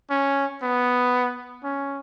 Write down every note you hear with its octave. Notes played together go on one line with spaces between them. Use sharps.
C#4
B3
C#4